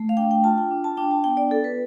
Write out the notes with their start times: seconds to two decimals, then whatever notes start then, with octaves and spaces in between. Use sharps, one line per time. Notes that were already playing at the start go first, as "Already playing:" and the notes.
Already playing: A3
0.09 F5
0.17 D4 G5
0.31 G5
0.44 F4 A5
0.58 G5
0.71 D4
0.84 A5
0.97 D4 G5
1.11 A5
1.24 B3 G5
1.37 D5
1.50 F4 A4
1.64 B4